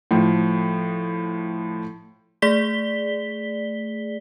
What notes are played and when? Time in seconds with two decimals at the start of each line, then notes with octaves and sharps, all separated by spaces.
0.11 A2 F3
2.42 A3 G#4 D5 B6 G7